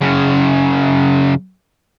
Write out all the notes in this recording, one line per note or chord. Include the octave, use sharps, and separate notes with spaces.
F#2 C#3